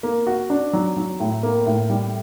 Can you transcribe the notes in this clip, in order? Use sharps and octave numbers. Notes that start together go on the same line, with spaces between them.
A#3
F#4
D4
F#3
F#3
A2
A#3
A2
G3